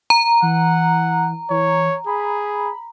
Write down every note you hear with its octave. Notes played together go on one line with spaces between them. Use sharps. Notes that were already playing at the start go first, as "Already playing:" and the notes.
A#5
E3 F#5
E3 C#5
G#4 B5